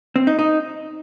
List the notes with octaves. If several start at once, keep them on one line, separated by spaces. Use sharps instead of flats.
C4
D#4
D#4